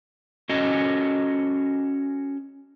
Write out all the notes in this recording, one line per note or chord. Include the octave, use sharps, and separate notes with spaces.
C#4 F#4 G#4 A4 D#5